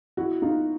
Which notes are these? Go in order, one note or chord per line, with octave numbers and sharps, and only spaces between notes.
E4 F#4
D#4 F4